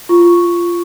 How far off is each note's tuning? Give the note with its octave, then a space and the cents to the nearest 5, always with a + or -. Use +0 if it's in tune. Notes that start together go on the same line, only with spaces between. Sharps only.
F4 -15 C#6 +0